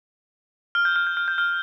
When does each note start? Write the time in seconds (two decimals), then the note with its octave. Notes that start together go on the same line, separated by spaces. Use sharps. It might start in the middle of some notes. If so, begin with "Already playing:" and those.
0.75 F6
0.85 G6
0.96 F6
1.07 G6
1.17 F6
1.28 G6
1.38 F6